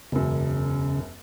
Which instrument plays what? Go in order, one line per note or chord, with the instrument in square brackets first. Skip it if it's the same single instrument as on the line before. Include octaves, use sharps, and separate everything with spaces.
[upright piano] E1 F#2 [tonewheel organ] C#3